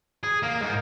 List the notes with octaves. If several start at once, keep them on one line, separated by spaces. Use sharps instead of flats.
G#4
A#3
G#2